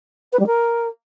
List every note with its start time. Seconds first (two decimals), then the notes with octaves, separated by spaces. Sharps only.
0.32 B4
0.39 G3
0.46 A#4